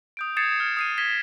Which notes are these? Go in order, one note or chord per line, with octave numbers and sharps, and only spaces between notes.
D#6 G6 D7
D#6 G#6 A6 C7 C#7 E7
F6
D#6 C7 D#7
G#6 A#6 B6 E7 G7